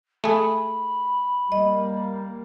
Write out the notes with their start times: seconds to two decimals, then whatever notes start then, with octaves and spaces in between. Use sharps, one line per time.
0.24 A3 G#4 B5
1.52 G3 A#3 D#5